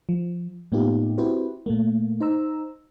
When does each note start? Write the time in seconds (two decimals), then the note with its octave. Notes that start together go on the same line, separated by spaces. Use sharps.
0.09 F3
0.72 A2 A#3 B3 D#4 F4 G4
1.18 C4 E4 F#4 G4 B4 C5
1.66 A#2 A3 A#3
2.20 D#4 C5 A#5 E6